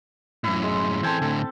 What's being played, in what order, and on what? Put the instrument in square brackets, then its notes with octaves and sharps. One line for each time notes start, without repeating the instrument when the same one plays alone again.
[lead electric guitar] F#2 A2 [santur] E4
[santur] G#3
[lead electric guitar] E3 A4 [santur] C4 G#5 A5
[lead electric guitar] A2 D3 [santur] A4